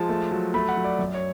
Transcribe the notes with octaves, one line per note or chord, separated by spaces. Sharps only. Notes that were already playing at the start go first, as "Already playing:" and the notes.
Already playing: F3 G#3 A5
A3
F#3
A3 B5
F#5
F#3
D5
F#2
C#5